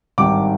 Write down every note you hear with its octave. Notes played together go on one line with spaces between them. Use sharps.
G#1 G2 D#3 D6